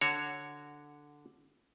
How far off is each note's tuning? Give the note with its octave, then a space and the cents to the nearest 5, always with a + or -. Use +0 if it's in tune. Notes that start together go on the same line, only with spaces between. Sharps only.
D3 +0 F#4 +0 C#5 +0